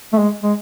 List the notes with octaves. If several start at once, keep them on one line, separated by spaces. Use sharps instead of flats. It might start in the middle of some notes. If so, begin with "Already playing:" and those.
A3
G#3
G#3